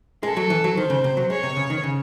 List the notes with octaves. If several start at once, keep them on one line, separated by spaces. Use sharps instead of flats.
G#3 A4
F#3
E3
F#3
D#3 C5
C#3
C3
F#3
G#3 C#5
C3
C#3
D#3
C#3